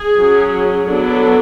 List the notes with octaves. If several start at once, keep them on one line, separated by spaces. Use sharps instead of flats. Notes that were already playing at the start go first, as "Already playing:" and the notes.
Already playing: G#4
F#3 C#4
F#3 B3 D4 A4